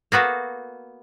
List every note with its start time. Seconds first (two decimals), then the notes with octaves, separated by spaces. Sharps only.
0.12 A#3 B3 F#4 A4